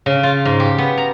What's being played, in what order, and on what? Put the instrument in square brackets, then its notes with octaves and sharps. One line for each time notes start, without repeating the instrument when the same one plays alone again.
[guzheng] C#3
F4
G#2
G4
B3
A#5